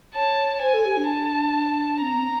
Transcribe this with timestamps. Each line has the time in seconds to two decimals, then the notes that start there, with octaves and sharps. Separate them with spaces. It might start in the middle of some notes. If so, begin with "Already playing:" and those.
0.15 C#5 A5
0.61 C5 G#5
0.74 A4
0.85 G4
0.97 D4
1.09 A5
2.02 C4 A#5
2.14 B3
2.18 C4